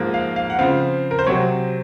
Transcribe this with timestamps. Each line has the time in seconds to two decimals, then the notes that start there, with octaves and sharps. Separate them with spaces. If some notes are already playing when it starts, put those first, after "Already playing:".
Already playing: G#2 F3 A#3
0.14 F5
0.36 F5
0.50 F#5
0.59 C#3 F3 C4 F5
1.11 A#4
1.19 C5
1.27 C3 F#3 C4 C#5